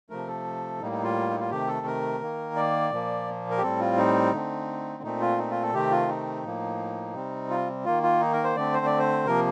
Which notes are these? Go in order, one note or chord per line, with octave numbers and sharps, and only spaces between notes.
C3 F3 A3 A#4
A4
A2 G3 A#3 D#4
D#4
F4
D#4
F4
C3 D#3 A3 G4
A4
A#4
D#3 A#3
D5
A#2 F3 A#3
A#4
G4
A2 G3 C4 A4
F4
D#4
D3 A3 C4
A#2 A3 C4 D#4
F4
D#4
F4
A4
C3 D#3 A3 C4 G4
F4
D#4
A2 F3 A#3
C3 G3 C4
F4
D#3 A#3 F4
F4
D#4
A#4
C5
D3 A3 C4 D5
C5
D5
C5
C3 F3 A#3 A#4